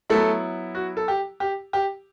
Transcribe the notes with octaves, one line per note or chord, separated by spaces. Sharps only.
F#3 A3 B3 E4 A4
F#4
A4
G4
G4
G4